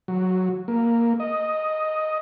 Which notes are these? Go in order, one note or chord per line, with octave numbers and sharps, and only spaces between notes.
F#3
A#3
D#5